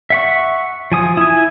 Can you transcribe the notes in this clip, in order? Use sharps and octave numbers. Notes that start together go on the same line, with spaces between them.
E5 F#5 C#6
F3 G#5 D#6
E4 G#5